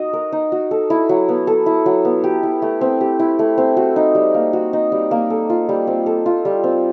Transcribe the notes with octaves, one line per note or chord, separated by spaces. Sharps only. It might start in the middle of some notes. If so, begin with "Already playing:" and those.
Already playing: D#4 F#4 D#5
A#4
D#4
F#4
A4
E4
F#3
B3
A4
E4
F#3
B3
G4
E4
A3
C4
G4
E4
A3
C4
F#4
D#4
G3
A#3
F#4
D#4
G3
A#3
A4
F4
G3
C4
A4
F4
G3
C4